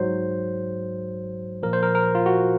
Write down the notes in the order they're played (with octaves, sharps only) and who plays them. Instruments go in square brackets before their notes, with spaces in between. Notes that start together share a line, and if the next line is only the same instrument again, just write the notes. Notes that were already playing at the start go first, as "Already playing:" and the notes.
Already playing: [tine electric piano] G#2 F#3 C5
A#2 F3 A#4
C5
A#4
A#4
F4
F#4